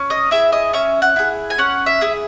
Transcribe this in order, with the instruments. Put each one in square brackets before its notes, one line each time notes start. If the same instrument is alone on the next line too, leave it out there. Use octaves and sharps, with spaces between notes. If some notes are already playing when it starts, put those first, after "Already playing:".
Already playing: [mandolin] C#4
D#5
E4 G#4 E5
D#5
C#4 E5
F#5
E4 G#4
G#5
C#4 F#5
E5
E4 G#4